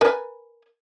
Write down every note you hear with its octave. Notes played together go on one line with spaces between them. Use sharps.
A#4 B4 G#5